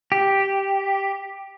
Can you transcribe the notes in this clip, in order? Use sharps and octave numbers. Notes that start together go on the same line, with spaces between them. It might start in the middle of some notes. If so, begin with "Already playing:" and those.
G4